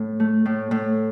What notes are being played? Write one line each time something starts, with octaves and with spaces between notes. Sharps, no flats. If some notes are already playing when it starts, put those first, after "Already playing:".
Already playing: A2
A3
A2
A2